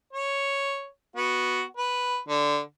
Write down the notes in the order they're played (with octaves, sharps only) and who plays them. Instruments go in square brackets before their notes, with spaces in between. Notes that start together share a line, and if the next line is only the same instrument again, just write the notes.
[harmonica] C#5
B3 F#4
B4
D3